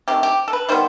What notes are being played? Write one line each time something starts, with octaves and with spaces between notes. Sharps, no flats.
C3 D#3 A3 G4
G4
A4
B4
D#3 G3 B3 C5